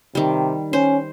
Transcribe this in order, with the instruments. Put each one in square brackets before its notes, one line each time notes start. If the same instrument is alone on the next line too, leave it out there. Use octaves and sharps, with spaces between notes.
[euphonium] C3 [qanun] D#3 G3
[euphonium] C#4 [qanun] C5